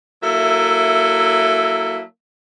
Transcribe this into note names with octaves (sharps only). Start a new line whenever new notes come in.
F#3 A#3 E4 A4 A#4 E5